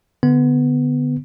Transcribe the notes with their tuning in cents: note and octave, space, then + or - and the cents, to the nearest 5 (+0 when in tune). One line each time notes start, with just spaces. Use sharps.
D3 +0 B3 +0